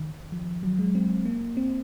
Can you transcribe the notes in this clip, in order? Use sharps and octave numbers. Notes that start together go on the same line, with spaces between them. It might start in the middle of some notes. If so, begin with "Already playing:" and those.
Already playing: D#3
F3
F#3
G#3
C4
A#3
C4